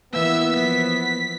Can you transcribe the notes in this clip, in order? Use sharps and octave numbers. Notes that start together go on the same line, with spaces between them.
E3 A#3 B3 E5 E6
F3 B6